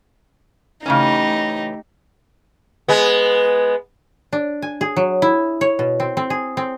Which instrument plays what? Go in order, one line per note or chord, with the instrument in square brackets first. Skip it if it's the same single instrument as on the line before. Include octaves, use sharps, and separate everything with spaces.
[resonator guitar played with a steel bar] C#3 E3 C#4 [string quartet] A3 D#4 G4
[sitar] G#3 B3
[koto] D4
G#5
G#4
F#3
E4
C#5
B2
C4
C4
G#4
C4